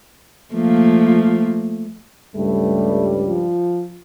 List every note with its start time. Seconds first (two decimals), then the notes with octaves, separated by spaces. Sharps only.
0.54 F3 A3 A#3
2.35 C#2 G2 G3 A3
3.28 F3